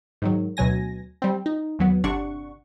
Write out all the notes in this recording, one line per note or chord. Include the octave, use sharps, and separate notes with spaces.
G#2 D#3 F#3
D2 B2 F#3 G#5 A#6
G3 C4
D#4
D#2 F#3 B3
G1 C3 D4 F#5 C#6